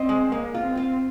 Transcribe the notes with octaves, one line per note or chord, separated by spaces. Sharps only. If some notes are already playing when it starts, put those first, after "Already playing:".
Already playing: C4 D#5
G#3
G#3 A#3
F4
C4
F4